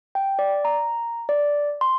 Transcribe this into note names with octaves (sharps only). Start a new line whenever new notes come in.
G5
D5
A#5
D5
C6